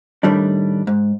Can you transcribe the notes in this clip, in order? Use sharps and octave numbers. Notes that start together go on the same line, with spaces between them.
A2 D#3 G3 A3 D4
G#2